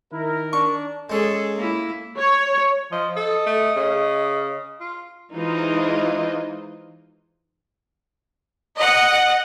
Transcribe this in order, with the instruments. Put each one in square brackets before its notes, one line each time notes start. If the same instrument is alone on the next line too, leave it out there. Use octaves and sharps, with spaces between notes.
[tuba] D#3 [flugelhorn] E4 [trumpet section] A#4
[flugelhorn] D4 [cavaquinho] C#6
[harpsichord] G#3 C#4 [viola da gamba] G#4 A4
[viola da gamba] A#3 E4
[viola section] C#5
[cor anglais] F3 [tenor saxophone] D#5
[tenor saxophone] A4 [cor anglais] D#5
[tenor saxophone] A3
C#3
F4
[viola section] E3 G#3 D#4 F4 C5 D#5
[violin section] D#5 F#5